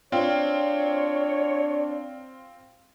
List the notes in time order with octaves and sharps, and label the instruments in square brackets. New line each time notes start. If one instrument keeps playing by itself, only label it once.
[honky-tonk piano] C4 F4 [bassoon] D4 [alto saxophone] C#5